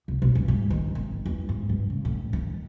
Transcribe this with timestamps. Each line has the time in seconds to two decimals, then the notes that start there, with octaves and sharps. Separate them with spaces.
0.08 C2
0.22 B1
0.35 G2
0.48 G#2
0.70 D#3
0.95 G#1
1.26 E2
1.49 G#2
1.69 G2
1.90 C#3
2.05 A2
2.33 D#3